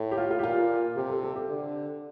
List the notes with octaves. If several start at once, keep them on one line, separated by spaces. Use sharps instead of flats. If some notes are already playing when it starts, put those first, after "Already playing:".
Already playing: A2
G4
F4
F4
G4
A#2 F4
C3 G4
A4
A4
G4
D3